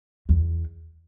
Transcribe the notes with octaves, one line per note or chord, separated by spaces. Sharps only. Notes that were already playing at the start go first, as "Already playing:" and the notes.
E2